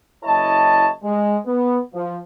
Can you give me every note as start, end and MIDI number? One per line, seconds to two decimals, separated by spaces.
0.23 0.90 30
0.23 0.90 64
0.23 0.90 73
0.23 0.90 75
0.23 0.90 81
1.02 1.36 56
1.46 1.78 59
1.94 2.17 53